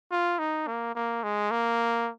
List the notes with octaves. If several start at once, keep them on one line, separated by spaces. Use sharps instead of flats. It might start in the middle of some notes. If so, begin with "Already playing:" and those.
F4
D#4
A#3
A#3
G#3
A#3